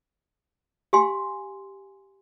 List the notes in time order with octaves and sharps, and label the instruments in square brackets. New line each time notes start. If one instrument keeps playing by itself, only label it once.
[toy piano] G4 F5 G#5 C6